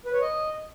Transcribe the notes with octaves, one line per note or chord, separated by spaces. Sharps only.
B4
C#5
D#5